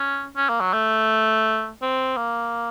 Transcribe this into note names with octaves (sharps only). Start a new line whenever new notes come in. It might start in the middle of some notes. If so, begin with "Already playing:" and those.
Already playing: C#4
C#4
A#3
F#3
A3
C4
A#3